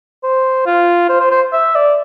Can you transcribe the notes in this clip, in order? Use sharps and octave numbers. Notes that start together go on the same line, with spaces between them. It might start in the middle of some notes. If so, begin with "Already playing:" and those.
C5
F4
C5
C5
C5
E5
D5